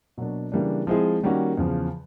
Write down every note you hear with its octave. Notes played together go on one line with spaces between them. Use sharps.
B2 F#3 A#3 D4
C#3 E3 G3 A#3 D4
F3 G#3 C4 E4 G#4
D#3 G3 A#3 C#4 F#4
E2 C#3 F3